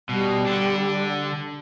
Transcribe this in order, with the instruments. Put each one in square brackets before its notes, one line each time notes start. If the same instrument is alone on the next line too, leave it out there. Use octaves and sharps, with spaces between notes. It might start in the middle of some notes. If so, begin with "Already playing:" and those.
[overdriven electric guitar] B2 [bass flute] G3
[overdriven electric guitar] D3 D4